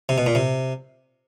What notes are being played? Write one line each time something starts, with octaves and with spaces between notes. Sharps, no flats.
C3
B2
A#2
C3